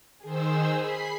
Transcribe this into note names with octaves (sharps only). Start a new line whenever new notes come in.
D#3 G#4 C5 E6
B5 B6 C7